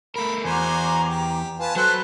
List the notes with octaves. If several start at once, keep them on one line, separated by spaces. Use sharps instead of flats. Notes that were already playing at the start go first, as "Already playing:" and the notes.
A3 A#4 B5
E2 F#4 C5 G#5 A#5 D6
G4
F4 B4 G#5 A5
F#3 F#4 A4 B4 C5 B5 F#6